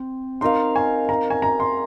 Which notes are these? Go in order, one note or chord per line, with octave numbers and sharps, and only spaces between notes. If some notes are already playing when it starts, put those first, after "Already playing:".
Already playing: C4
D#4 A#4 F5 C6
G#5
A#5
G#5
A#5
C6